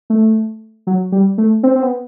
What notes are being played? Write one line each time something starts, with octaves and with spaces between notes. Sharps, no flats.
A3
F#3
G3
A3
C4
C4
B3